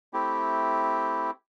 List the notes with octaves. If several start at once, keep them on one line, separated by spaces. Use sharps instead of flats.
A3 C4 E4 G4